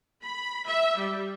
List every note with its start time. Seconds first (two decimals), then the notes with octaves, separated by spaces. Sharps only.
0.22 B5
0.67 E5
0.97 G3